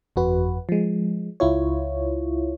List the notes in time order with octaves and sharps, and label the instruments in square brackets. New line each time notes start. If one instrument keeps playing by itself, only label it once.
[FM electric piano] G1 F2 F#4 B4
F3 G#3
C#2 E4 F4 C#5